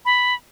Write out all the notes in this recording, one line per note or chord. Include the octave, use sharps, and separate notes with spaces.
B5